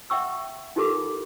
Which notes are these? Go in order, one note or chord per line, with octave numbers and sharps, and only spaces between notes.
E5 F#5 G5 C#6 E6
D#4 F4 G4 A4 A#4 D6